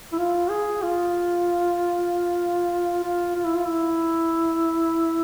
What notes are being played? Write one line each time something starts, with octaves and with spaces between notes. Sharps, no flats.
E4
F4
G#4
F4
F4
F4
E4
F4
E4